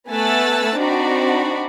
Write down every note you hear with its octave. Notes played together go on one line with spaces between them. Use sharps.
A3 B3 G#5 E6 F#6 A6
C4 D4 D#4 F#4 D5 B5